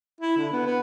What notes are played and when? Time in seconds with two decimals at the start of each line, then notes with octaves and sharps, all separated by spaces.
0.20 E4
0.37 D3
0.52 B3
0.66 B3